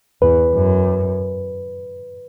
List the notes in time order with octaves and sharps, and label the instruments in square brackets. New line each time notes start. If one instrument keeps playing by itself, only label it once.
[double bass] E2 [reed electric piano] B4
[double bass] F#2